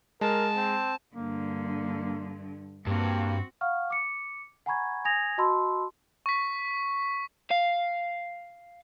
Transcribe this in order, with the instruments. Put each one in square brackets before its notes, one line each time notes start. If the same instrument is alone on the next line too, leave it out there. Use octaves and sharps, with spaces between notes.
[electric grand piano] G#3 [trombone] A#4 [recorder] A5
[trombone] C4
[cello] G2 D3 [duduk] A#3
[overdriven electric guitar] G2 [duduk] A#3 [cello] C4 F#4
[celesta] F5 F#5 C#6 F6
D6 C#7
F#5 G#5 A#5 B5 C#6 G#6
G#5 D#6 G#6 A#6 F7
F#4 D#5 A5 B5 C6 E6
[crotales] C#6 B6
[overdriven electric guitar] F5